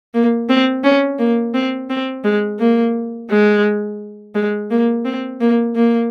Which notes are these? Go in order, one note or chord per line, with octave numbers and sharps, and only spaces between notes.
A#3
C4
C#4
A#3
C4
C4
G#3
A#3
G#3
G#3
A#3
C4
A#3
A#3